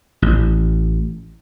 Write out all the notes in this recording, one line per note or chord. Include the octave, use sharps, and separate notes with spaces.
A1